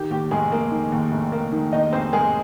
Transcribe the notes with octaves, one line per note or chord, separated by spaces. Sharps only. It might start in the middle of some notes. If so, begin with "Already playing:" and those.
Already playing: D#3 G4
D#2 G4
F1 G#3 G#4
A#3
D#3
D#2
F1
A#3
D#3
D#2 D#4 D#5
F1 C4 C5
G#3 A#3 G#4